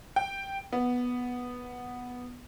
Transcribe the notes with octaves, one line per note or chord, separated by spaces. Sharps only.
G5
B3